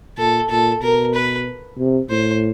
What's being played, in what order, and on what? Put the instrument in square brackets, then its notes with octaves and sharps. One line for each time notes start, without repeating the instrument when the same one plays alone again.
[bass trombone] A#2 [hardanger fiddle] A4
[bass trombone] A#2 [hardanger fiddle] A4
[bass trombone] B2 [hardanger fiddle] A#4
[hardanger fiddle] B4
[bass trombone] C3
[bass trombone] A2 [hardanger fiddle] C5